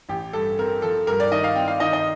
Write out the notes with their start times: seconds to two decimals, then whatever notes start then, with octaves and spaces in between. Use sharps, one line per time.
0.09 A1 G4
0.33 G2 A4
0.58 C4 A#4
0.82 F3 A4
1.07 G2 A#4
1.20 D5
1.32 D#3 D#5
1.44 F5
1.56 C4 G5
1.68 F5
1.80 D#3 D#5
1.93 D#5